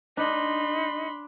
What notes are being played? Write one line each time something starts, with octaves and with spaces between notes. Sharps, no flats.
D4 D#4 B5 C6